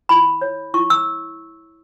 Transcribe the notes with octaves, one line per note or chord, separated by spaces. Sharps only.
E4 B5
C#5
E4 C#6
E6